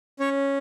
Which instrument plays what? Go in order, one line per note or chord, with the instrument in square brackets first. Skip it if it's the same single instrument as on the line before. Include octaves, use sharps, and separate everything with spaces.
[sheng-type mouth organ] C#4 C#5